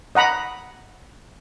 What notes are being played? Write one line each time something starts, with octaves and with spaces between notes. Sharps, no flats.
D#5 F#5 A#5 B5